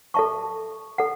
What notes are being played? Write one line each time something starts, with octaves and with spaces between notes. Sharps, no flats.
A4 E5 A5 C#6
A4 F#5